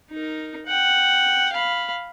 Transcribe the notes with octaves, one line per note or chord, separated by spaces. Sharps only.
D#4 A#4
F#5 G5
F5 B5